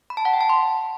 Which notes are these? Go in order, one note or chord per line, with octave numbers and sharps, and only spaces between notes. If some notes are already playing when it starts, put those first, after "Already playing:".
B5
A5
F#5
G5
A5
C6